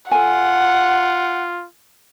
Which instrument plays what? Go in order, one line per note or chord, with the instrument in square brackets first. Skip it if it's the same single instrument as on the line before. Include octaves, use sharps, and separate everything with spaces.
[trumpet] F4 [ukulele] A4 G#5 [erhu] F#5